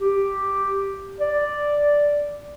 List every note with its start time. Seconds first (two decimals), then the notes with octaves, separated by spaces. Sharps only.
0.01 G4
1.20 D5